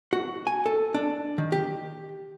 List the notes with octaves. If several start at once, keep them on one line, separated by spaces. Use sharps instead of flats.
F#4
G#5
A4
D4
D#3
G4